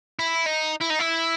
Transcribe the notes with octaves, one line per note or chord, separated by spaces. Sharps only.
E4
D#4
E4
D#4
E4